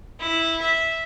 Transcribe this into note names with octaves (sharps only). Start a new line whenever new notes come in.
E4
E5